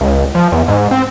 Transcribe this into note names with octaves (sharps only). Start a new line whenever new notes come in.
C#2
F3
E2
G#2
C4